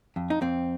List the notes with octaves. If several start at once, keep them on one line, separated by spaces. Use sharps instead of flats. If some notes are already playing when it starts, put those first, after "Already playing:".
F2
D#4
F2 C4